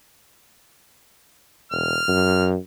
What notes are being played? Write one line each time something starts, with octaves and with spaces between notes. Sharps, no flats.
E1 F6
F#2